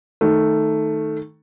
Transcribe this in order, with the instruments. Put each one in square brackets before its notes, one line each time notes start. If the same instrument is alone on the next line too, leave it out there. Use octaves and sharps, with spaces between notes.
[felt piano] D#3 A3